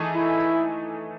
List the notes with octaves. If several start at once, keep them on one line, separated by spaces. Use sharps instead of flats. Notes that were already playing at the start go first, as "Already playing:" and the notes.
Already playing: E3 A3 D#4 G#4
E4